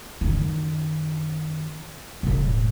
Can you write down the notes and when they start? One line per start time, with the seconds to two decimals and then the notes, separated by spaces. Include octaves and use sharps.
0.21 F#2 D#3
2.23 E1 A2